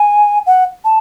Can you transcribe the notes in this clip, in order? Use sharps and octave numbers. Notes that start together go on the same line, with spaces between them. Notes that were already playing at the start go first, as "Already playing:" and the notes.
Already playing: G#5
F#5
A5